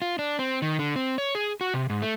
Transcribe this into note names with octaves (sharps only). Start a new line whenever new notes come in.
F4
D4
C4
D#3
D3
C4
C#5
G#4
F#4
C3
G#2
A3